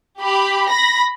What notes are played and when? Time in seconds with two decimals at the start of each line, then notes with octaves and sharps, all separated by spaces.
0.20 G4 B5
0.70 B5 A#6